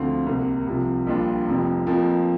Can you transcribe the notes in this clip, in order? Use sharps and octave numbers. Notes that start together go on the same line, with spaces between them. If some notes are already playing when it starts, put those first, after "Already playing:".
Already playing: D2 D3 F3 C4 F4
C2 C3 A#3
C2 C3 F3
A#1 A#2 G3 D4 F4
F1 F2 F3
F2 F3 A#3